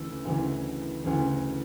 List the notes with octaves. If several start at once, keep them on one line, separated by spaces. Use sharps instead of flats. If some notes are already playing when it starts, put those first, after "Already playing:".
Already playing: D2 C#3 E3 E6
D2 C#3 E3
D2 C#3 E3